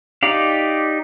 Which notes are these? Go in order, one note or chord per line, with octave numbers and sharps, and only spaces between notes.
D#4 G4 D5 F5